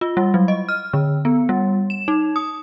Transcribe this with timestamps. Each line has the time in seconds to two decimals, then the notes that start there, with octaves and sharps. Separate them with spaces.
0.01 F4
0.17 G3
0.34 F#3
0.48 D#5
0.69 F6
0.93 D3
1.25 B3
1.49 G3
1.90 E7
2.08 D#4
2.36 D#6